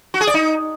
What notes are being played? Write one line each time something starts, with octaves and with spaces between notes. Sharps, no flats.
F#4
G#4
D5
D#4